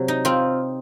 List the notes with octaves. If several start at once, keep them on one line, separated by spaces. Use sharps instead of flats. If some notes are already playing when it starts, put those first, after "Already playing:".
Already playing: C3 F#3
D#4
C4 F4